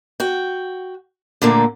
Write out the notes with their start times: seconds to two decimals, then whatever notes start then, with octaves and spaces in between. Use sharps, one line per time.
0.20 F#4 G5
1.42 A#2 D3 A3 A#3